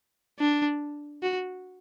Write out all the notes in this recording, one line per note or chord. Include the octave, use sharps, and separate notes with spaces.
D4
F#4